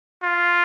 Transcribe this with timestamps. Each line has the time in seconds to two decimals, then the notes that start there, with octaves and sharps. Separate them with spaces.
0.23 F4